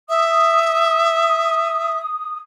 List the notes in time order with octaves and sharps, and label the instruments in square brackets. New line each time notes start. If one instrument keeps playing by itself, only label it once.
[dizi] E5 [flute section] D#6